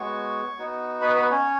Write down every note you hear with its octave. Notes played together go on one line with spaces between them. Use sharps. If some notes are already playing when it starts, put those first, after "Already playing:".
Already playing: G#3 B3 F#4 C#5 C#6
B3 D#4 F#4
B4 B5
B4 B5
C#4 C#5